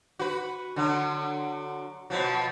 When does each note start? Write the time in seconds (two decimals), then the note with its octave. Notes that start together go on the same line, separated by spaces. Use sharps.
0.19 F#4 B4
0.76 D3 F#3
2.10 B2 F3 F#3